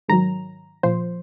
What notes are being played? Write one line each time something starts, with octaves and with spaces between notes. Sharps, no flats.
G#2 D#3 F#3 A#5
A#2 F3 C5